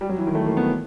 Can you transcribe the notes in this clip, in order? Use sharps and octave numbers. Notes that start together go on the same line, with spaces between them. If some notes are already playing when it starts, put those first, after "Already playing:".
G3
F#3
E3
D#3
A3
A#3
B3